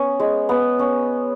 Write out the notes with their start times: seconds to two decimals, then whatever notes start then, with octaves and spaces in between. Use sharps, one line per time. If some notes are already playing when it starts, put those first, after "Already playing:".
Already playing: B3 C#4
0.20 G#3
0.49 B3
0.79 C#4